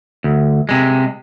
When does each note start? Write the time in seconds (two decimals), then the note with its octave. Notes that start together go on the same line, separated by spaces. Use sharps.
0.24 D2
0.69 C3 G#3